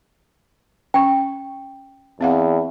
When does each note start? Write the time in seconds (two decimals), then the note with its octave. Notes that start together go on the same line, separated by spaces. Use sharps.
0.94 C#4 G5 C#6
2.21 E2 C4 F5 F#5